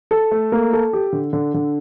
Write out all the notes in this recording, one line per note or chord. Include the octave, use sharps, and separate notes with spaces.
A4
A3
A#3
A4
G4
D3
D3
D3